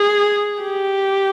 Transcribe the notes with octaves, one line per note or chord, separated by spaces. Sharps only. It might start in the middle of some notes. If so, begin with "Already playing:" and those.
Already playing: G#4
G4